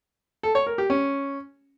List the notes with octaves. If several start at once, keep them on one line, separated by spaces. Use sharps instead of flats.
A4
C#5
A#4
G4
C#4